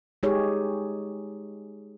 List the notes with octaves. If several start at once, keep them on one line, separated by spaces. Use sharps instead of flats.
G#3 D#4 G4 G#4 C#5